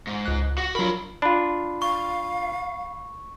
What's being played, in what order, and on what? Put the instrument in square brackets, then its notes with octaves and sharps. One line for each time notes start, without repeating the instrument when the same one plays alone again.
[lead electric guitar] G#2
[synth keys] C#2 F#6
[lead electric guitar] F#4
[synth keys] F#3 A#4 [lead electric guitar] F4 B5
[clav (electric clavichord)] D4 F4 [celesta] B5
[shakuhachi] F5 [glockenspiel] C#6